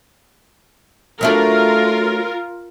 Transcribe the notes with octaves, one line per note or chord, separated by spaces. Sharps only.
F#3 A3 D4 F4 A#4